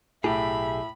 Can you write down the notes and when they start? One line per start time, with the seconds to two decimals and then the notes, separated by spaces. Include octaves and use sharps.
0.24 B1 A2 G4 G#4 E5 B5